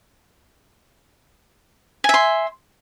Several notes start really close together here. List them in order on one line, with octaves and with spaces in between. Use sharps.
G#5 E5 C6